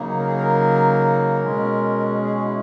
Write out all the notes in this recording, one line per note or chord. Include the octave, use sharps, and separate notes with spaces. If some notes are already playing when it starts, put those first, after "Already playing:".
Already playing: C#3 F#3 A#3 D#4
A#4
G#4
A#4
B2 G#3 C#4
G#4
F#4
E4